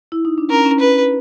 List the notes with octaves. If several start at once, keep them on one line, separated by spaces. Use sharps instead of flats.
E4
D#4
D4
C#4 A#4
C#4
C#4 B4